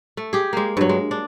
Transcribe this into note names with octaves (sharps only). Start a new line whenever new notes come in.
A3
G4 G#4
G#3 A#3
G2 F#3
G#3
D4